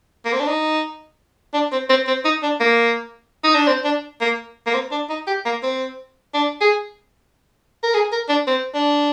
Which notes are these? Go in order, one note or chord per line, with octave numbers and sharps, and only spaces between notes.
A#3
C4
D4
D#4
D4
C4
C4
C4
D#4
D4
A#3
D#4
D4
C4
D4
A#3
A#3
C4
D4
D#4
G4
A#3
C4
D4
G#4
A#4
G#4
A#4
D4
C4
D4